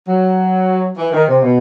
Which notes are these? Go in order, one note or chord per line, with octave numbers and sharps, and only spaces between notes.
F#3
E3
D#3
C3
B2